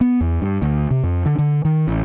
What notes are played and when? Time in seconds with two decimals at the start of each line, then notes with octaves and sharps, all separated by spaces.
0.01 B3
0.21 E2
0.42 G2
0.62 D2
0.91 C3
1.03 F2
1.26 D3
1.38 D3
1.65 D#3
1.88 A1